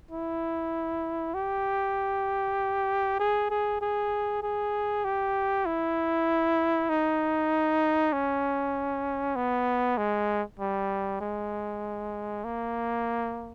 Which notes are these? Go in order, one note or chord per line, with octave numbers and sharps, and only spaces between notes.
E4
G4
G#4
G#4
G#4
G#4
G4
E4
D#4
C#4
B3
G#3
G3
G#3
A#3